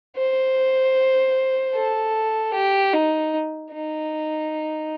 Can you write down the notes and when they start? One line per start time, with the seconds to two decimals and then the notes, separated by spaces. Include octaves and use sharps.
0.16 C5
1.75 A4
2.54 G4
2.94 D#4
3.73 D#4